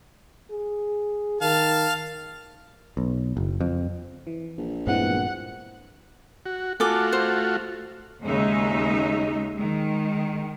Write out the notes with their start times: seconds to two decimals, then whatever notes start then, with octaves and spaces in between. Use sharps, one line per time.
0.51 G#4
1.41 D#3 F5 A5
2.97 B1
3.37 F#1
3.60 F2
4.27 E3
4.57 A#1
4.87 G2 A#2 E3 G#3 B3 C4 F#5
6.46 F#4
6.80 A3 F4 F#4 A4 G#5 D6
7.12 C5
8.23 D#2 C#3 G#3 C#4 D#4 E5
9.54 D#3 G#3